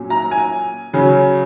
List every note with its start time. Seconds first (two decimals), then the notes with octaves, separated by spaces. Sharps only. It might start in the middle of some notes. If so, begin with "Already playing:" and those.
Already playing: A#2 F#3 C#4
0.10 A#5
0.31 G#5
0.93 C#3 F#3 C#4